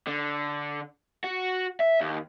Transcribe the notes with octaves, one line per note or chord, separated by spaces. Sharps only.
D3
F#4
E5
D#2